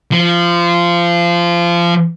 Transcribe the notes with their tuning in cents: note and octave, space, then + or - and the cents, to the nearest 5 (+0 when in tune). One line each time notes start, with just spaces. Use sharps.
F3 -20